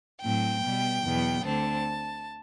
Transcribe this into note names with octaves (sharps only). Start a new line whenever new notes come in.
A2 F#3 C4 G5
B2 G3 B3
E2 B2 F#3 B3
D2 D3 A3 C4 A5